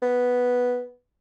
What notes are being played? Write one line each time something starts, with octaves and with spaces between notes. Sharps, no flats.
B3